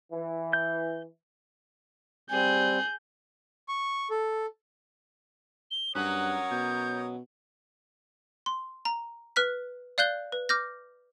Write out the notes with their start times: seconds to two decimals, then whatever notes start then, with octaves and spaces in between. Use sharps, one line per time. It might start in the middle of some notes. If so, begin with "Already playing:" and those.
0.12 E3
0.53 G6
2.31 G3 C4 G#4 G6
3.68 C#6
4.10 A4
5.71 G7
5.95 G2 F#3 C#4 A#4 C#5 D#6 F#6
6.51 B2 G6
8.46 C6
8.85 A#5
9.36 B4 F6 F#6 B6
9.98 D5 F5 F#6 G6 G7
10.32 B4
10.49 D6 F6 G6 A#6